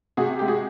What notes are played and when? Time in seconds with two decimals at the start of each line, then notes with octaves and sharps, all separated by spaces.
0.17 C3 F#4 G#4
0.39 G#3 G4
0.48 F#4 G#4